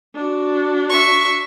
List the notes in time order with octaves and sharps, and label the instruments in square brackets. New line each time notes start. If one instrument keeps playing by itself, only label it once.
[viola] D4 F#4
[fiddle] E5 C#6